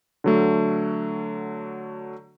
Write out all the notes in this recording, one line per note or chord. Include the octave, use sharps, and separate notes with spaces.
D3 F#3 A3